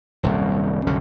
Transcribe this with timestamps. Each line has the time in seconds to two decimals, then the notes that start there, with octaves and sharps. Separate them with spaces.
0.23 D#1 C2 F#2
0.87 C2 F#2 D3 C#4